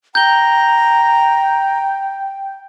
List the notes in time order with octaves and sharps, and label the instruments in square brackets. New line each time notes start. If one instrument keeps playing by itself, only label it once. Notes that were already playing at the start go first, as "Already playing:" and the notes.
[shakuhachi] G5 [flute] A#5 [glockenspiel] G6 G7